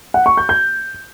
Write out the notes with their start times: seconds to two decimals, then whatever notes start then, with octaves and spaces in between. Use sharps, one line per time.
0.14 F#5
0.26 C#6
0.37 G6
0.49 G6